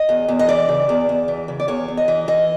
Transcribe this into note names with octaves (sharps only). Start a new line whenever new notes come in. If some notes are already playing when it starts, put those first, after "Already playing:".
Already playing: D#5
E2
E2
D#5
E3 D5
C#3
E2
E2
E3
C#3
D5
E2 C#5
E2
D#5
E3
E3 D#5